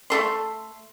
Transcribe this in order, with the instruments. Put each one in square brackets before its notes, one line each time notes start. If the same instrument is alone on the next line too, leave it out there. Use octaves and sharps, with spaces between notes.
[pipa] A3 A4 C6